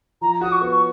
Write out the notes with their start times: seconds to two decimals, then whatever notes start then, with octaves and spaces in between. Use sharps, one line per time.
0.21 F3 A#5
0.41 F#4 D#6
0.52 C#6
0.61 B3
0.71 C#6